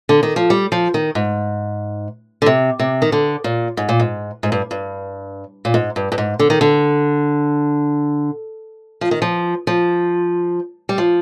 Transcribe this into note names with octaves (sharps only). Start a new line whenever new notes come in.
D3
D#3
F3
G3
F3
D#3
G#2
D3
C3
C3
D#3
D3
A#2
G#2
A#2
G#2
G#2
G2
G2
A#2
G#2
G2
G2
G#2
D3
D#3
D3
F3
D#3
F3
F3
G3
F3